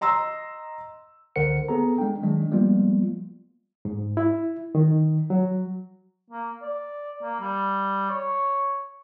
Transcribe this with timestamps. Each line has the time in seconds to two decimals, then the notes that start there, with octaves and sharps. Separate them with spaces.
0.01 D#5 A#5 C6 E6
1.36 C#2 D3 A#4 C5 F#5 C#7
1.68 B3 G#4 A4 A#5
1.98 G#3 D4 G5
2.22 D#3 F#3 G#3 D4
2.51 F3 G3 G#3 A#3 B3 F4
3.85 G#2
4.17 E4
4.75 D#3
5.30 F#3
6.31 A#3
6.62 D5
7.22 A#3
7.40 G3
8.10 C#5